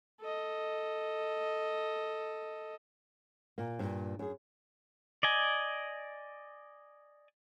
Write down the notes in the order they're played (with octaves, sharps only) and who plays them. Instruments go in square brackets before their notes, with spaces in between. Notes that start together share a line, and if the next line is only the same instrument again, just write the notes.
[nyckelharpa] A4 D#5
[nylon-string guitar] A#2 A#3
G2 A#2
F#2 G#4
[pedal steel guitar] D5 D#5 G#5